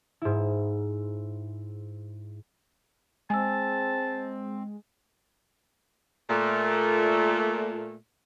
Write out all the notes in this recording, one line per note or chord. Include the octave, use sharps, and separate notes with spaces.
G#2 E4
G#3 C4 G#5 A5 E6
A#2 A3